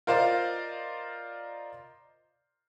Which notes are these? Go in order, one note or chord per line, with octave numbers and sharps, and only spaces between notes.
F4 A#4 C5 D5 D#5 F5